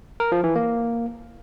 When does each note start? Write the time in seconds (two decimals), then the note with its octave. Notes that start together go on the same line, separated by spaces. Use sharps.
0.20 A#4
0.32 F3
0.44 E3
0.55 A#3